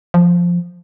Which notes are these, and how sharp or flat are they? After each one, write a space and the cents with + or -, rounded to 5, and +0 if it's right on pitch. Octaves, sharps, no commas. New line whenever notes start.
F3 +0